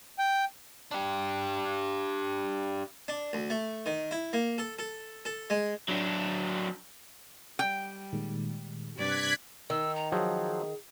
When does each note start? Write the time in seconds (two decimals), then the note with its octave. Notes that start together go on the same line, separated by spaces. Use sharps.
0.19 G5
0.91 D4 G4
3.08 D4
3.33 D2
3.50 A3
3.86 D#3
4.11 E4
4.33 A#3
4.58 A4
4.79 A4
5.25 A4
5.50 G#3
5.88 F#3 D4
7.59 G3 G5
8.13 A#2 D#3 G#3
8.96 G2 C3 D5 F#6 G#6 B6
9.70 D#3 E6
9.95 A#5
10.12 F3 F#3 G#4